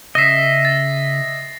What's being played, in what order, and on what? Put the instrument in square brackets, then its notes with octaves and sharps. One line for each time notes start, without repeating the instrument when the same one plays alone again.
[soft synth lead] C#3 [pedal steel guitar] D#5 E5 [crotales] A#6 C7
[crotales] A6